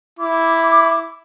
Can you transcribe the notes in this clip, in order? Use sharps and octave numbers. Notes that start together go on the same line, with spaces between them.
E4 D6